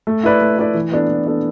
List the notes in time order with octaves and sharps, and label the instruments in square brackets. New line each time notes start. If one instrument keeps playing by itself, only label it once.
[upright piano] A3
E4 B4 D5
A3
E4 B4 D5
E3
B3 D4 A4
E3
B3 D4 A4